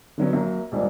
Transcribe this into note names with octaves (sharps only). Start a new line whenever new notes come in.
D3 D#3 F#3 B3 C#4
F#2 F#3 A#3
D#1 G#2 G3 D4